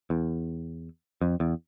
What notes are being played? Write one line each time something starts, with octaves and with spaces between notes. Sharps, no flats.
E2
F2
E2